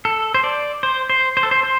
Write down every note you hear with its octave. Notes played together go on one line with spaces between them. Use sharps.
A4
C5
D5
C5
C5
C5
A4
C5
C5